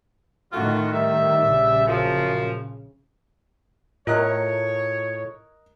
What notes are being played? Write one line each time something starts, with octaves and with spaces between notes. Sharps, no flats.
A2 D#3 A3 F4 F#4
G3 E5
A#1 C#3
F#2 F3
A2 F4 A#4 C#5 D#5 F#6